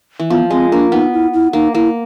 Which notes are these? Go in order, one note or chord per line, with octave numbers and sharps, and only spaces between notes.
E3
F3 B3
G#3 C4
A#3 D4
B3 D#4
E4
E4
A#3 D#4
A#3 E4